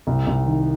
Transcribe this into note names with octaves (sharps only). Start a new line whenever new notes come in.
C2
C2
D#3